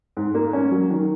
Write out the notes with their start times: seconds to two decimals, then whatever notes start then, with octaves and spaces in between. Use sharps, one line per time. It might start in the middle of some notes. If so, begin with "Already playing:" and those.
0.17 G#2
0.35 A#3
0.53 C#4
0.71 F#3
0.90 D#3